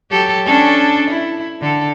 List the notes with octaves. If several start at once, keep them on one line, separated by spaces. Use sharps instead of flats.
F#3 G4 A4
C#4 D4 A4
E4
D3 A4